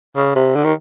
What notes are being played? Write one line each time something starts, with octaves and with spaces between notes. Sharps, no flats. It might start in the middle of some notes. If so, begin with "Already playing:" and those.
C#3
C3
D3
D#3